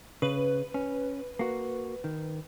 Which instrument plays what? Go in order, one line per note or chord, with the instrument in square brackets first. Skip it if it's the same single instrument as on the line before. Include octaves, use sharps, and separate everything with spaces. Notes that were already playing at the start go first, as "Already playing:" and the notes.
[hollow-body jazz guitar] C#3 [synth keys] B4
[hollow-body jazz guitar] C#4
A#3 F#4
D#3